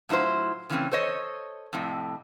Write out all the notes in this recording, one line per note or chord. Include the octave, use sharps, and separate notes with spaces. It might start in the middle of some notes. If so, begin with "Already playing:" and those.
A2 F#3 E4 F4 C5
C#3 E3 A3 A#3 C4 C#4
A4 C5 C#5 D#5
F2 A2 C3